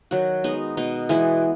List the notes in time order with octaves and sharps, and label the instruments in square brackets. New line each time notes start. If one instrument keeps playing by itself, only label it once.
[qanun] D#3 F#3 F#4
G#3 B3 D#4
B2 D#4
E3 G#3 B3 E4